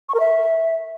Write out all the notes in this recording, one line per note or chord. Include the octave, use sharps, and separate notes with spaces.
C#6
A#4
E5